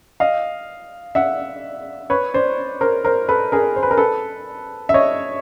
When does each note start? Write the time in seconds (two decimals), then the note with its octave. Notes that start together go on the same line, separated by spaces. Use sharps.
0.20 D#5 F5
1.15 E5 F#5
2.10 B4 C#5
2.34 C5 D5
2.81 A#4 C5
3.05 A#4 C5
3.29 A4 B4
3.52 G#4 A#4
3.76 C5
3.83 B4
3.91 A#4
3.97 A4 B4
4.89 E5
4.94 C#5 D#5